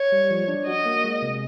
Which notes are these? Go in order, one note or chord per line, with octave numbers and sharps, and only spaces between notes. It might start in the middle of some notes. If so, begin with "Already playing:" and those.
Already playing: C#5
G3
F3
D4
F#4 D#5
A#3
G#3
C3